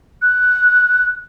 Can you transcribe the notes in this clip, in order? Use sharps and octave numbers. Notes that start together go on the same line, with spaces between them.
F#6